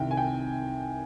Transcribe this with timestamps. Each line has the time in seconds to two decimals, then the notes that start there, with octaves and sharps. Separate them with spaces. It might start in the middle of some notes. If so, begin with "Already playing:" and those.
Already playing: C2 C3 D#3 G5
0.11 G#5
0.17 G5